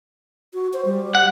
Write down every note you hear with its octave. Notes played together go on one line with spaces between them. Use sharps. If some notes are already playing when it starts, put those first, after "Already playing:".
F#4
C5
G3
F#5